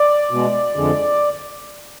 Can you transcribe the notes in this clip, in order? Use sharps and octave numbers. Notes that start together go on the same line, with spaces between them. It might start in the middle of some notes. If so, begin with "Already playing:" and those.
Already playing: D5
B2 G#3
F2 D3 G#3